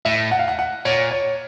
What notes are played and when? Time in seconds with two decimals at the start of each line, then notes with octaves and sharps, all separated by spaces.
0.05 A2 E5
0.31 F#5
0.39 F5
0.48 F#5
0.59 F#5
0.85 A#2 C#5
1.11 C#5